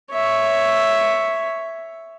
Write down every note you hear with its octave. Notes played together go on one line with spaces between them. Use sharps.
C#5 E5